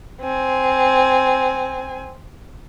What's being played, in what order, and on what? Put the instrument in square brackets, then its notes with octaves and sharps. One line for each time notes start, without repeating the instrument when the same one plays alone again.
[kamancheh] C4 G#5